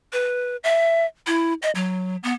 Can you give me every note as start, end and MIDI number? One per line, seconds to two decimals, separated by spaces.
0.13 0.56 71
0.64 1.06 76
1.27 1.53 64
1.62 1.70 75
1.75 2.16 54
2.23 2.32 59